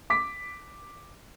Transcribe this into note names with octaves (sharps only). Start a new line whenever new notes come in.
D6 B6